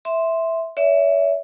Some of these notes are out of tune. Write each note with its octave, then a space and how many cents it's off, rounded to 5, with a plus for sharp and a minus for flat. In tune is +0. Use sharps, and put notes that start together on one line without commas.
E5 -5 C6 +0
C#5 +40 E5 +0